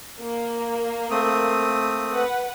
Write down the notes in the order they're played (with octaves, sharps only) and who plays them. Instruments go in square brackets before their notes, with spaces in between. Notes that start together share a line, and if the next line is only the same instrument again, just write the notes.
[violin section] A#3
[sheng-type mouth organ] A3 C4 D#6
[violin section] B4 F#5